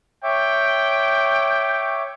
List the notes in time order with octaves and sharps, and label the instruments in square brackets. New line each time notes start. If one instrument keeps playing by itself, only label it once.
[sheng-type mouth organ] C#5 E5 D6 [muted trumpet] G5